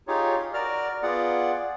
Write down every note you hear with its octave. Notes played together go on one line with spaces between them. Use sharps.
D#4 F4 G4 G#4 C#5
F#4 A#4 D5 F6
B3 F4 G#4 D5 F#5